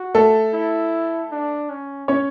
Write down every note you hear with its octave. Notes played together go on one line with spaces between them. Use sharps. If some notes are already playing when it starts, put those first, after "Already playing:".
Already playing: F#4
A3 A4
E4
D4
C#4
C#4 C#5